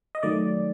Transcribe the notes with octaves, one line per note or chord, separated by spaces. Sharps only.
D#5
D#3 F#3 A3 D5